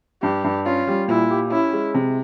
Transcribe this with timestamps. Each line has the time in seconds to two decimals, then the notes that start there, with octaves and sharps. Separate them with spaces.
0.22 G2 G4
0.44 G2
0.65 C#4 F4
0.87 G3
1.08 A#2 E4
1.30 G4
1.51 C#4 E4
1.73 G#3
1.95 C3